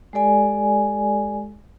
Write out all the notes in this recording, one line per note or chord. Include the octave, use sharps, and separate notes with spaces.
G#3 G4 A4 D5 G#5